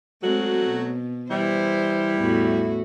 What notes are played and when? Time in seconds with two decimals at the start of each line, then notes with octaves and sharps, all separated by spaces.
0.23 F#3 G#3 A3 C4 F#4
0.66 B2
1.30 E3 G3 E4 C5
2.16 E2 A2 F#4